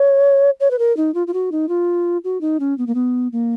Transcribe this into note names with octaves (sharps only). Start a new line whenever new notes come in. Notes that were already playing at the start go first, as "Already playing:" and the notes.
Already playing: C#5
C#5
B4
A#4
D#4
F4
F4
F#4
D#4
F4
F#4
D#4
C#4
B3
A#3
B3
A#3